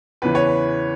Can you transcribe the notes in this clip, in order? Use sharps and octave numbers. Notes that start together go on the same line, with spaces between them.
E2 C#3 E3 B4
C#5
B4